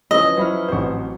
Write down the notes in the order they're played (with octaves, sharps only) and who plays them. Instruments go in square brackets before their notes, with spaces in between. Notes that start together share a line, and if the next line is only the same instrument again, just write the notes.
[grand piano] E3 F3 C#4 [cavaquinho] D#5
[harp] F#3 B5 F6 [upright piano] E4 C5
[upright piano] A1 C4 C5 [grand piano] F#4 C#6